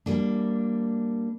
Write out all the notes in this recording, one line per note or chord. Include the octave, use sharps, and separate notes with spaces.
G3 A#3 D4